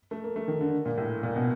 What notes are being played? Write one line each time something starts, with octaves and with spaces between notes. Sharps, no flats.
A3
A#3
A3
D#3
D3
A#2
A2
A#2
B2